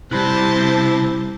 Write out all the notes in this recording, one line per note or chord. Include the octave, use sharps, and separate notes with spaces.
C3 G3 E4 C5 A5 B5 F#6